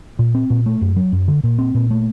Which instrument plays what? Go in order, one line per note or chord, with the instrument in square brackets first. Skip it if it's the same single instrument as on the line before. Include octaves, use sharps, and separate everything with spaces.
[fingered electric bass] A#2
C4
A#2
A3
F#2
F#3
F#2
D3
A#2
C4
A#2
A3